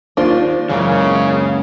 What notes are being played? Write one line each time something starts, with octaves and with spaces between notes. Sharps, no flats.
D#2 D4 F4 C5
C#2 F#2 C#3 E3 A#4